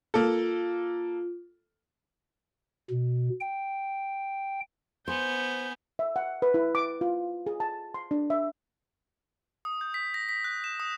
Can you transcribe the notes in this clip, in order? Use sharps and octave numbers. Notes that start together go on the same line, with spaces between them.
A#3 F4 A4
B2
G5
B3 C5 G#5 G6
E5
F#5
B4
E4
D6
F4
G#4
A5
C6
D4
E5
D#6
G6
B6
A#6
B6
F#6
E7
D#6